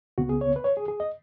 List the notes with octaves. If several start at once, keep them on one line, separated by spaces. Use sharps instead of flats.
C#2 C#3 B3 F#4
G#4
C#5
B4
C#5
G#4
G#4
D#5